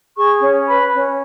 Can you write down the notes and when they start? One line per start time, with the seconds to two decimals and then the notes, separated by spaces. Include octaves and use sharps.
0.16 G#4 C#6
0.41 C#4
0.67 B4 B5
0.92 C#4